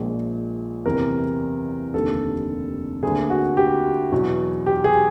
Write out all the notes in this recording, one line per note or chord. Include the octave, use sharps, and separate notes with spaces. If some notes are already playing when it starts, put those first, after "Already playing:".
Already playing: A#1 A#2 F3 G#3
F#1 E2 C3 E3 A#4
F1 D#2 D3 G3 A#3 A4
D2 D3 G3 A#3 G#4
F#4
G4
E2 B2 F#3
G4
G#4